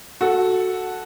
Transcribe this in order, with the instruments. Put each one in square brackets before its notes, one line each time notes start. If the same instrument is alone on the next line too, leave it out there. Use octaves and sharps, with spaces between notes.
[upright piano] F#4 A4